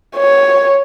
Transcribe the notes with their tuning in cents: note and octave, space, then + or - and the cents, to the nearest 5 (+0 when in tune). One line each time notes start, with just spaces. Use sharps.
C#5 +0